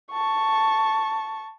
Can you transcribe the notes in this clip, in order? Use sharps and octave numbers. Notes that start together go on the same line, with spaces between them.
A5 C#6